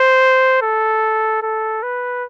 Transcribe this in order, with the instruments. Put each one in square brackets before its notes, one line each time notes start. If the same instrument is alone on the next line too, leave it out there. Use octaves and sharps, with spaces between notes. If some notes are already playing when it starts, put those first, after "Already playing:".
Already playing: [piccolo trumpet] C5
A4
A4
B4